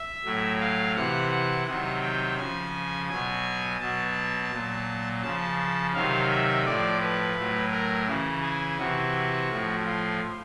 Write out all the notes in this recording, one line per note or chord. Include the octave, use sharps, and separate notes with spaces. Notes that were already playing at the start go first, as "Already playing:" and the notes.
Already playing: E5
A2 F#3
F5
C3 E3 F#5
F#5
C3 D#3 F#3 F#5
G5
C#3 F3 G#5
B2 F#3 G#5
B2 F#3 A5
A#2 F#3
C#3 F3 A5
C3 D#3 F#3 F5
E5
A2 F3 D5
B4
A2 F#3
A#4
C#3 E3
G#4
C3 E3 F#4
A2 F3
F4